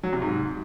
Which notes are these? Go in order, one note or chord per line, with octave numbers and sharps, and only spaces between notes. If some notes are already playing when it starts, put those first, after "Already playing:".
F#3
C3
G#2